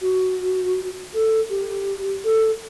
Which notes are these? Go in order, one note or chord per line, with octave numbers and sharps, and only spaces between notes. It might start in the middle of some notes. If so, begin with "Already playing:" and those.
F#4
A4
G4
A4